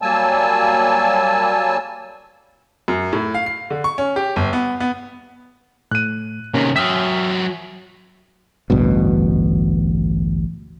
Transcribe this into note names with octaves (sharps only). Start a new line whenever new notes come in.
F#3 G3 A#3 G#5 A5 E6
F#2
A2
F5
C7
D3
C#6
C#4
G4
G1
B3
B3
A2 F#6 D#7
C3 D#3 A#3 C#4
F#3 E5 G5 D#6 F6 B6
A1 D2 G2 B2